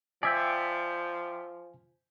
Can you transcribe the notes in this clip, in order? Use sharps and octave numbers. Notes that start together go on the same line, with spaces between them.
F3 D5 E5 G5 G#5